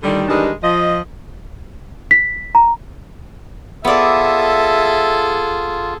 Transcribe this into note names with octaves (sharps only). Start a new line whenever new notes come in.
A2 D3 D#3 G3
D#3 E3 G3 G#3 D4 D#4
F3 D#5
B6
A#5
B3 F4 G#4 A4 D5 E5